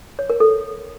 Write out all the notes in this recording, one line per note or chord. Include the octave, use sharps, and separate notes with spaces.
C#5
A#4
A4